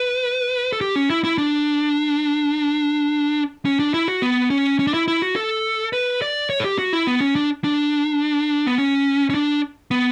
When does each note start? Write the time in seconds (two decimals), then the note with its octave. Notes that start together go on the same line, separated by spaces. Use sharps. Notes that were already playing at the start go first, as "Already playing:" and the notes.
Already playing: B4
0.73 A4
0.81 G4
0.96 C#4
1.10 E4
1.24 E4
1.38 D4
3.65 C#4
3.79 D4
3.94 E4
4.08 F#4
4.22 B3
4.50 C#4
4.79 C#4
4.87 D4
4.94 E4
5.08 E4
5.22 F#4
5.36 A4
5.93 B4
6.22 D5
6.50 C#5
6.60 A4
6.64 G4
6.78 F#4
6.93 E4
7.07 B3
7.21 C#4
7.36 D4
7.64 D4
8.67 B3
8.78 C#4
9.30 C#4
9.34 D4
9.91 B3